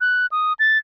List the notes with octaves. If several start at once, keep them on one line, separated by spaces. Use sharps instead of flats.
F#6
D#6
A6